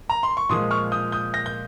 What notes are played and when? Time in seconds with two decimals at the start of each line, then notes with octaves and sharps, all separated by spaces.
0.09 A#5
0.23 C6
0.37 C#6
0.49 A#2 F3 G#3 C6 D#6
0.71 C#6 F6
0.92 D#6 G6
1.12 D#6 G6
1.34 G6 A#6
1.46 G6